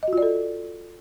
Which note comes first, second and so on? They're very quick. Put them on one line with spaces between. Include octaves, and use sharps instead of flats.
D#5 F#4 F4 D5 A4